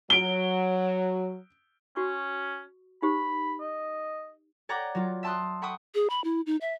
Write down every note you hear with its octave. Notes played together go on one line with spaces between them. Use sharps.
F#3 D7 G7
C#4 F#4 C#6
D#4 G4 C5 B5
D#5
C#5 D5 F#5 G5 A#5 D6
F#3 F4
E5 G5 A5 C6 D#6 F#6
F#5 G5 B5 C#6 D#6
G#4
B5
E4
D#4
E5